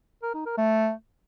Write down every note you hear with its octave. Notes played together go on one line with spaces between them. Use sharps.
A#4
D#4
A#4
A3